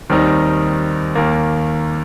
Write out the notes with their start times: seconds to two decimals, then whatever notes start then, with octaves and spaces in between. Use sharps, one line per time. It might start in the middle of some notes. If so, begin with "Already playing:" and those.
0.10 D#2 D#3 G3 C4 D#4
1.15 D#2 D#3 A#3